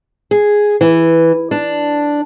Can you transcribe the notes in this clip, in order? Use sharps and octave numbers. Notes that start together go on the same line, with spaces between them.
G#4
E3
D4